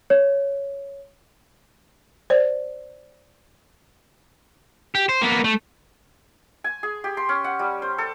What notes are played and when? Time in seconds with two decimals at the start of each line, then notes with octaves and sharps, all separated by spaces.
0.10 C#5
2.30 C5 D5
4.95 G4
5.09 C5
5.21 A#3 B3
5.44 A3
6.64 G#5
6.83 G#4
7.04 G4
7.17 C6
7.29 C#4
7.44 F#5
7.59 G3
7.82 C5
7.98 A4